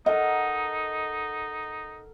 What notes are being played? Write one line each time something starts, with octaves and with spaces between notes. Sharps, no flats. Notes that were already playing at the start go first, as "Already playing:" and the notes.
D#4 A4 A#4 D#5 F#5